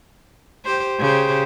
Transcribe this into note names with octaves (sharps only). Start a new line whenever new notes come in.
G4 C5
C#3 G4 C5